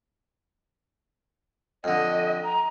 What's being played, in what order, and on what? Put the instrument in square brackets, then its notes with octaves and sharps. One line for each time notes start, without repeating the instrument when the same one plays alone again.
[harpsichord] F2 D3 [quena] D#5
[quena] A#5